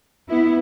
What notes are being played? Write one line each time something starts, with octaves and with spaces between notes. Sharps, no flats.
B3 E4